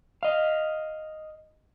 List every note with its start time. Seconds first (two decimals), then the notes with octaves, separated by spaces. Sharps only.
0.23 D#5 F5